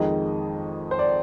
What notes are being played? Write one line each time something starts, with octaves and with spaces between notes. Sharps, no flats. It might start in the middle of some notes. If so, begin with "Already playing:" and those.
Already playing: F2 D#3 G#3 D#5
C5
D5